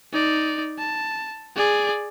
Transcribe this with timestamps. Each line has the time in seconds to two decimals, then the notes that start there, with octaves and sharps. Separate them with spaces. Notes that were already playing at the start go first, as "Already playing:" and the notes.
0.13 D#4 D5
0.78 A5
1.56 G#4 D5